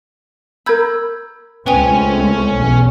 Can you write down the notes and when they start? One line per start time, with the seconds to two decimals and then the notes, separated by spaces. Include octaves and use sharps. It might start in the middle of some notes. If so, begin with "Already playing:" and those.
0.66 A#4 B5 E6 G6 G#6
1.66 C#2 A3 C4 C#4 B4 C#5 G5 G#5
2.55 B1 E2 B2